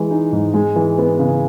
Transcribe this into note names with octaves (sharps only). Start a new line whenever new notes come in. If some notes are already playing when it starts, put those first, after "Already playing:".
Already playing: E3 G#3
D#4
G#2
G#3
E3
B3
C#3